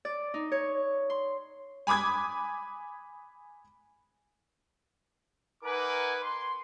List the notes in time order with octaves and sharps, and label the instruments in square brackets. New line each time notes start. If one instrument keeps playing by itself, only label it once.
[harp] D5
D#4
C#5
C6
[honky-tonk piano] G#5 B5 D6 D#6 G#6
[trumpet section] D#4 A#4 B4 F#5 G#5 D6
C6